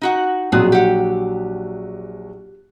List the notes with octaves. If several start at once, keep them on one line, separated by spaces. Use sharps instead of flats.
D#4 F#4 F#5
A#1 B2 F#3 C4 G#4 F#6
G4 F#5